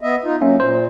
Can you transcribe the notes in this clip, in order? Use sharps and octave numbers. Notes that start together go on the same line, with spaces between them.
B3 D#5 E5
D#4 F4
F#3 A#3 C#4 E5
A#2 C5